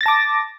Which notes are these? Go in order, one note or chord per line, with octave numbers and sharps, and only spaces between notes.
A5 D6 A6 A#6